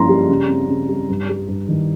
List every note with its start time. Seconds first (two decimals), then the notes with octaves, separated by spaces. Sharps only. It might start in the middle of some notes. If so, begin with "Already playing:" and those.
Already playing: G2 F3 A#3 C#4 A#5 C6
0.09 G3
0.29 C#3
0.49 C4
0.68 C#3
0.88 G3
1.09 G2
1.29 G3
1.48 G2
1.69 D#3